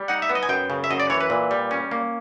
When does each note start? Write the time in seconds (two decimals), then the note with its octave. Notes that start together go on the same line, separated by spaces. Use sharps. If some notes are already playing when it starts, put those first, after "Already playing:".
Already playing: G3
0.08 D#4 F#5
0.22 E5
0.29 B3
0.35 D#5
0.43 G#5
0.49 F#2 G5
0.70 C#3
0.84 E5
0.91 F#2 D#5
1.00 D5
1.10 E3 C#5
1.20 B4
1.30 A#2
1.51 G3
1.71 C#4
1.91 A#3